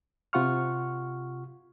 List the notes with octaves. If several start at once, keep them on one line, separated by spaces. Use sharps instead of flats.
C3 F4 F#5 C#6 F6